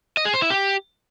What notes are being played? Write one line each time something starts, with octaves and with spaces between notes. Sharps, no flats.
D#5
G#4
C5
E4
G4